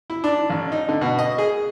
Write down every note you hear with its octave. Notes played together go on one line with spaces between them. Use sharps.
E4
D4
A1
D#4
D3
B2
D#5
G#4